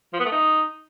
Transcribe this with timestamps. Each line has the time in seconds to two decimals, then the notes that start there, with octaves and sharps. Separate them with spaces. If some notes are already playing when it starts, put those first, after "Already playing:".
0.13 F3
0.20 B3
0.26 A3
0.32 D#4